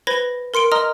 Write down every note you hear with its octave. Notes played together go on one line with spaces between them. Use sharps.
B4 C5 B5 G#6 A#6 G7
A#4 C6 C#7 D7
D#5 A#5 C6 D#6 F6